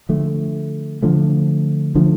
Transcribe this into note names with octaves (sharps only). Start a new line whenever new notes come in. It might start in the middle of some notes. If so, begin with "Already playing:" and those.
D3 F3 A3
D3 F3 A3
D3 F3 A3